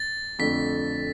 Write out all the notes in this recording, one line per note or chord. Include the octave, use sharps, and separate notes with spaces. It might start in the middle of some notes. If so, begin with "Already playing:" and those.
Already playing: A6
F2 D3 A3 B6